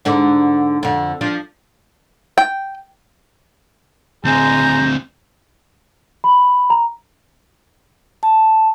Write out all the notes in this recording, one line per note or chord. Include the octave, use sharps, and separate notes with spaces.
G#2 D3 D4
F2 D3
F3 D4 F4
G5
D2 G#3 C4 G#5 A#5 G6
B5
A#5
A5